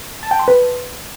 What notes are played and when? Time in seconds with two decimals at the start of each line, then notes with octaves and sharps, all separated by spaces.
0.23 A5
0.31 G5
0.39 C6
0.48 B4